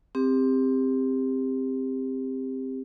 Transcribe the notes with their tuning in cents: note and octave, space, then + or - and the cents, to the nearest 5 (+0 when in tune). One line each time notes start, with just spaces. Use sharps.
C4 +0 G4 +25